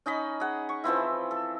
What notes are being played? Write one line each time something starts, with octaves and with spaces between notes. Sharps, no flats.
C#4 D#4 D#5 B5
G#4 F#5
C#6
E3 F3 C4 E4
A4